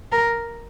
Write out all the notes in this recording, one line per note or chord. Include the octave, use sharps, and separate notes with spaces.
A#4